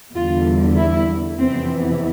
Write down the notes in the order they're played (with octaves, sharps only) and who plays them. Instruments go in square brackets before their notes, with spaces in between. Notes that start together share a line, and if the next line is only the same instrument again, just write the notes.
[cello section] E2 D3 G3 F4
E4
F2 C3 E3 B3 C4